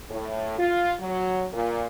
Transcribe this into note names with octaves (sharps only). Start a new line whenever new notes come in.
A2
F4
F#3
A#2